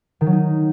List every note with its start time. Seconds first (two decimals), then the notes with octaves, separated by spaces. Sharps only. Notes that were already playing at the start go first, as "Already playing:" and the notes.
0.21 D#3
0.26 F#3
0.32 D#4